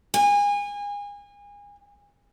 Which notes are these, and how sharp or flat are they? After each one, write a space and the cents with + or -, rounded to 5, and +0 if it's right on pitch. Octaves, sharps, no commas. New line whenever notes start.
G#5 -30